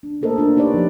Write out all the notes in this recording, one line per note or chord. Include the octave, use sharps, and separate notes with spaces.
D4
A3 A#3 A4 A#4 C5 D#5
A#3 D4 F4 A#4
D#4 G4 B4 C#5 D5
F3 G4